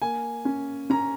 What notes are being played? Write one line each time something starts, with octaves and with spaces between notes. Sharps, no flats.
A#3 G#5
C#4
C#4 A#5